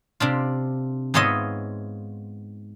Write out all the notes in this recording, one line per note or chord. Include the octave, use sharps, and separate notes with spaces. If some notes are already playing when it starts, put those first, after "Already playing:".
C3 D4 F4
G#2 B3 F4 C#5 D#5 E5